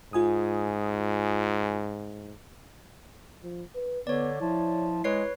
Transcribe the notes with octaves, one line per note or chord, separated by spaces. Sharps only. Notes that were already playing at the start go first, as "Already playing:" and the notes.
G#2 F4 G#5 D#6
F3
B4
D3 B3 C#5 D5
F3 E4
G#3 B4 C#5 C7